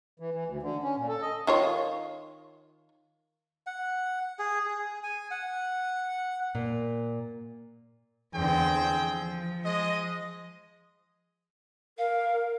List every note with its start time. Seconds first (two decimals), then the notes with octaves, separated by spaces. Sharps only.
0.20 E3
0.34 E3
0.47 D2
0.62 D3
0.83 C#4
0.97 A#2
1.08 A4
1.22 D#5
1.47 D#3 F4 C#5
3.66 F#5
4.39 G#4
4.66 G#4
5.03 G#5
5.31 F#5
6.55 A#2
8.34 E2 D3 C4 G#4 G5
8.88 F3
9.64 G#3 D#5
11.98 A#4 F5